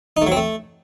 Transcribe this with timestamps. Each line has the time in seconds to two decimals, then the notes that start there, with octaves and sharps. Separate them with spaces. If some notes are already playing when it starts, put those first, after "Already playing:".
0.17 D#4
0.22 A3
0.27 F#3
0.32 C4
0.37 A3